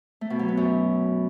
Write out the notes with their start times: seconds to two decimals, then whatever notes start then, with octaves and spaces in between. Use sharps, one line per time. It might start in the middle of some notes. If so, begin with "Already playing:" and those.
0.21 A3
0.30 B2
0.39 F#3
0.48 B3
0.57 F#2